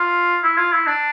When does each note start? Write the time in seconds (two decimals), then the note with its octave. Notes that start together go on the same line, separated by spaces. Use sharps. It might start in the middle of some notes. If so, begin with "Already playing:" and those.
Already playing: F4
0.43 E4
0.58 F4
0.72 E4
0.87 D4